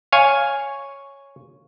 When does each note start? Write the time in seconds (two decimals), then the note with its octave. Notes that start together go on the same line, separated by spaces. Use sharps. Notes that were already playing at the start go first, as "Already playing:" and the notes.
0.12 C#5 F5 G#5